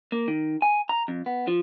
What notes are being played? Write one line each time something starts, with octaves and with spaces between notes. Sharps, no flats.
A#3
D#3
G#5
A#5
F2
B3
F3